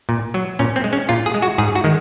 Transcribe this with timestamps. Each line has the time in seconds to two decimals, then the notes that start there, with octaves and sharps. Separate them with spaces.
0.09 A#2
0.34 F#3
0.59 A#2 C#4
0.76 C4
0.84 G#3
0.93 C#4
1.09 A#2 F4
1.26 G#4
1.34 G#3
1.42 F#4
1.58 G#2 G#4
1.75 F#4
1.84 D#3 G#3